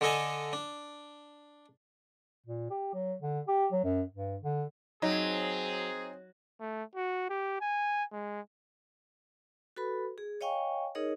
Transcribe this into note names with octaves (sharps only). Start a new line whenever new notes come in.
D3 D4 A4 D#5 G#5 A5
D4
A#2
G4
F#3
D3
G4
F#3
F#2
G2
D3
F#3 C4 D#4 G#4
A3
F#4
G4
G#5
G#3
F#4 A4 B4 B5
G#4
C#5 D#5 F5 G5 G#5 C#6
D#4 G#4 A#4 C#5 D#5